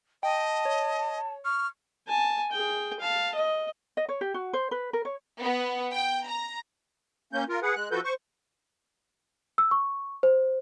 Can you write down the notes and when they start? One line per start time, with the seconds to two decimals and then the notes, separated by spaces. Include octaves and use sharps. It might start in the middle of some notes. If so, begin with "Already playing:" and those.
0.23 D#5 G5 A5
0.65 C#5
1.45 C#6 F6
2.07 G#5 A5
2.51 G#4 G5
3.00 F5 A5
3.35 D#5
3.97 D#5
4.09 C#5
4.21 G4
4.34 F#4
4.53 C5
4.71 B4
4.93 A#4
5.05 C#5
5.41 B3
5.93 G5
6.28 A#5
7.33 A#3 C#4 G6
7.49 F4 A#4
7.62 G#4 B4 F#5
7.76 G#3 F#6
7.91 F3 F#4 A4 B4 G6
8.04 C5 C#6
9.58 E6
9.71 C#6
10.23 C5